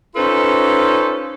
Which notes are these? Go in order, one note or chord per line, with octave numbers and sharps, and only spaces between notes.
C#4 D#4 F4 A4 B4 C5